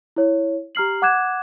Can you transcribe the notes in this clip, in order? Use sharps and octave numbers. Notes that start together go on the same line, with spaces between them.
E4 C#5
G4 A#5 F6 C7 F#7
F#5 D6 F#6 G#6 E7